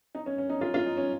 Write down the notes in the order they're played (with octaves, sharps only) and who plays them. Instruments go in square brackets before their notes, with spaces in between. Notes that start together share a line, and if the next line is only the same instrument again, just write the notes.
[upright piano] D#4
C#4
C#4
D#4
F4
F4
D#4
C#4